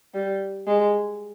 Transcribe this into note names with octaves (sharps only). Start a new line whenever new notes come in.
G3
G#3